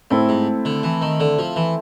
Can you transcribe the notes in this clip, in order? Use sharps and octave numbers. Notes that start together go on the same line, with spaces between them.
A2 A3 C4 E4 A4
G#2
D3
E3
D#3
D3
F3
E3